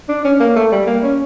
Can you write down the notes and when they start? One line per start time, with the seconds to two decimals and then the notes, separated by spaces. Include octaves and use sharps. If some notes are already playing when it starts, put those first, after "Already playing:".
0.09 D4
0.24 C#4
0.40 A#3
0.56 A3
0.72 G3
0.87 A#3
1.03 C#4